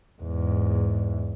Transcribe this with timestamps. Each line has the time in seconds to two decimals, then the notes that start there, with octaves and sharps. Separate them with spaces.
0.22 E2 G#2